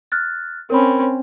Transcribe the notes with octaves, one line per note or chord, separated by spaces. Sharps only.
F6 F#6 A6
C4 C#4 A#4 C#5 B5